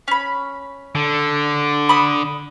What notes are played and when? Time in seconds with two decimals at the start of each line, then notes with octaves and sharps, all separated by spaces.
0.08 C#4 B5
0.95 D3
1.89 B5 D#6